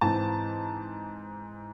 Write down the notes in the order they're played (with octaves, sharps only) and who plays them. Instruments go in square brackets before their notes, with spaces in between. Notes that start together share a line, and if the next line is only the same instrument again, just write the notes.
[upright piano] G#2 E3 C4 A5